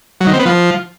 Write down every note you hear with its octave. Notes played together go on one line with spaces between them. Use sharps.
F#3
D#3
C4
B3
F3